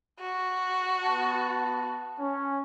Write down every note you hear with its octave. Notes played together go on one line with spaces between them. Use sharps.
F#4
B3 A5
C#4